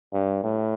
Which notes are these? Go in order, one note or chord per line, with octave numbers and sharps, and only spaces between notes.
G2
A2